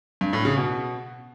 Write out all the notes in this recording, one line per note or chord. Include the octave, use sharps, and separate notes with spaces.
G2
A2
C#3
B2